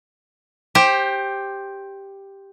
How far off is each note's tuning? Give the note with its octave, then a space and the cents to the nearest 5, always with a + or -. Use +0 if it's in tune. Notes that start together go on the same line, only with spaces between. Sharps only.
G4 +5 C5 +20